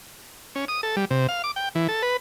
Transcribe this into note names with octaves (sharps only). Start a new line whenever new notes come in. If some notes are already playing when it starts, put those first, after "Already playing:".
C#4
D#6
A4
G3
C3
F5
D6
G5
E3
A4
B4